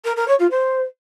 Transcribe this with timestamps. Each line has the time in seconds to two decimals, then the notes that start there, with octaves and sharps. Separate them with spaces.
0.05 A#4
0.16 A#4
0.28 C#5
0.39 F4
0.51 C5